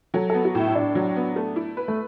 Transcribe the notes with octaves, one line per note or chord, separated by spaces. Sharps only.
F#3 A4
B3 A4
F#4
A2 E4
E4
A2 D4
F#3
B3
A3
E4
B4
A3